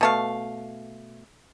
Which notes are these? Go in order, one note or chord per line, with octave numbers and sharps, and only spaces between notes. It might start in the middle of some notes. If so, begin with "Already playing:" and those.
B2 A3 F5